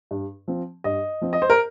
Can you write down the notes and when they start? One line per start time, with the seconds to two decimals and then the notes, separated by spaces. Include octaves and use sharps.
0.11 G2
0.48 F3 C4
0.84 G2 D#5
1.21 F3 C4
1.33 D#5
1.42 C5
1.50 A#4